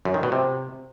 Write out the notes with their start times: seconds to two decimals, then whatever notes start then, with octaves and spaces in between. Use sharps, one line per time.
0.05 F#2
0.14 D#3
0.23 B2
0.32 C3